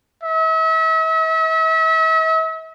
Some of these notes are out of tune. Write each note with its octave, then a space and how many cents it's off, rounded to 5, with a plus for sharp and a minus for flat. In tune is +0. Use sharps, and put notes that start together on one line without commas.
E5 -40